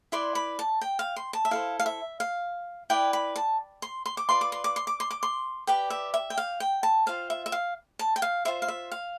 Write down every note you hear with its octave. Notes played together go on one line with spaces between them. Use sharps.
E4 B4 D5 C6
B5
A5
G5
F5
C6
A5
E5
E4 A4 C5 F5
F5
E5
F5
E4 B4 D5 G5
B5
A5
C6
C6
D6
F4 B4 D5 C6
D6
C6
D6
C6
D6
C6
D6
C6
G4 B4 D5 G5
E5
E5
G5
F5
G5
A5
F4 C5 F5
E5
E5
F5
A5
G5
F5
F4 C5 E5
F5
E5
F5